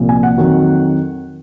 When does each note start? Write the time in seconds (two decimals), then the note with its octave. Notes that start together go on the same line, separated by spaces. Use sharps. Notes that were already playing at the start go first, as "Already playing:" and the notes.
Already playing: C2 A#2 F3
0.09 G#5
0.23 F#5
0.37 F2 D#3 F#3